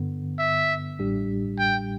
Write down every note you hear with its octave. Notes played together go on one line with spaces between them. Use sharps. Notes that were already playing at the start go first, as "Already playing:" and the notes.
Already playing: G2 D3 B3
E5
A1 A2 G3 D4 G4
G5